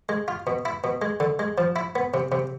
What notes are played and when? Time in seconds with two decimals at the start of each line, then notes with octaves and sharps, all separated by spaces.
0.09 G#3
0.28 F4
0.47 B2
0.65 E4
0.84 B2
1.02 G#3
1.20 D3
1.39 G#3
1.58 F3
1.76 E4
1.96 B3
2.14 C3
2.32 C3